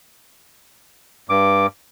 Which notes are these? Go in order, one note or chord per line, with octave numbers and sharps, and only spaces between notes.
G2 D6